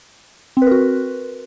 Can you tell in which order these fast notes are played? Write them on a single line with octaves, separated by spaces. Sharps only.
C4 B4 A#4 F#4